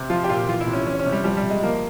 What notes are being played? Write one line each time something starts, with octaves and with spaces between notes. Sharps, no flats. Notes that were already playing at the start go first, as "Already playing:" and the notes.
Already playing: C3
F3 F4
G4
A#2 F4
E3 F4
E4
C3
C#4
E3 C#4
C#4
C3
G3
F3 G3
G3
C3
G#3
F3 A#3